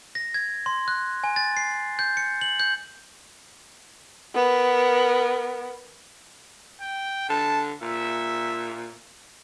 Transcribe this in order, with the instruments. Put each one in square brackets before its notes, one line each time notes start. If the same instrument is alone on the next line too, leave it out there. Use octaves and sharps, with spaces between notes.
[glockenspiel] A#6
G#6
C6
F#6
G#5
A6
C7
G6
C#7
F#7
G6
[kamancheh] B3 A#4
[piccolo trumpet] G5
[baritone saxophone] D3 [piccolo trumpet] A5
[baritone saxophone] A#2 [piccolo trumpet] E5